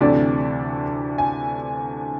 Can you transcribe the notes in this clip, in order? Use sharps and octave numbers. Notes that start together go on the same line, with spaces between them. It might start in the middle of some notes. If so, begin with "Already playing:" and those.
D2 C3 E3 A3 D4 D5
G#5